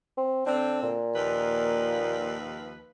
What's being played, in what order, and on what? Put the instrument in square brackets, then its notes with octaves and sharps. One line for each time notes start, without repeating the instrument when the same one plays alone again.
[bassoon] C4
[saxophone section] D3 C4 [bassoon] D4
[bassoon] A#2
[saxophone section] D#2 F3 B4